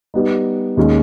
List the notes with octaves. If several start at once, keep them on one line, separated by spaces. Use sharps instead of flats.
G3 B3 D#4
D#2 D#3 G#3 C#4